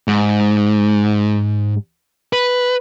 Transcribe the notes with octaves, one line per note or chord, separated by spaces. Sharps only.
G#2
B4